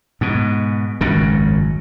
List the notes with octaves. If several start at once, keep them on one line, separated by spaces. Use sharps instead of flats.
G#2 B2
G#1 C#2 F#2 C#3